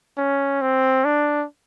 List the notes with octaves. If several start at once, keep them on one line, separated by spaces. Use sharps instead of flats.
C#4
C4
D4